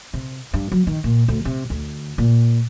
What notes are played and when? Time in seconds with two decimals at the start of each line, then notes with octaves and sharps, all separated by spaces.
0.13 C3
0.54 G2
0.72 F#3
0.87 D#3
1.04 A#2
1.28 D2
1.45 C3
1.70 D2
2.18 A#2